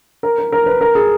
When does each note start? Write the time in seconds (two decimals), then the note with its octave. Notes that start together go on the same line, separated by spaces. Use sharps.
0.23 A#4
0.38 A#4
0.52 A#4
0.66 B4
0.81 A#4
0.95 G#4